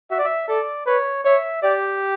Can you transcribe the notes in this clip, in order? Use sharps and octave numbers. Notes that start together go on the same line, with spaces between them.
F#4 E5
D5
E5
A4 D5
B4 C#5
C#5 E5
G4 D5